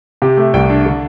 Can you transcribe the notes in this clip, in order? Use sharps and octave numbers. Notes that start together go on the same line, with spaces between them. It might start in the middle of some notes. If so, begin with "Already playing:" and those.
C3 G4
A3
C2 G5
D4
D3